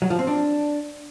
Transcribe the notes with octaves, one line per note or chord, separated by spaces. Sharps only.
F#3
F3
C4
D4